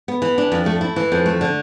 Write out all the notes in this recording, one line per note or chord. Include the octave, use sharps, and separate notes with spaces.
B3
E3
D4
F2
A3
E4
E3
F2
A3
D3